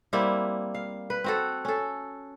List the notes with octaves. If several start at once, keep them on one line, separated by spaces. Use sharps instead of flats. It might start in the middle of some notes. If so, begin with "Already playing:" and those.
G3 A#3 C4 E4
F5
B4
C4 F#4 A4
C#4 A4